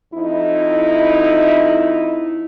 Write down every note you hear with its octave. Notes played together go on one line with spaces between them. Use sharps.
F2 D#4 E4